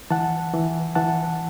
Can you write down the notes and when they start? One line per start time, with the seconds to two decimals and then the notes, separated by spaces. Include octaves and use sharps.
0.11 E3 F#5 A5
0.53 E3
0.95 E3 F#5 A5